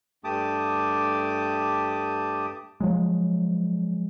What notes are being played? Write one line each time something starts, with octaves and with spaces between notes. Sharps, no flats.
G2 A3 G4 A5 D6 D#6
F3 F#3 G#3